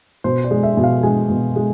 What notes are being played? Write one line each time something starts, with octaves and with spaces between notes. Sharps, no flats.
B2 C5
D5
G#3
E5
B2
F5
G#3 G#5
B2
G#3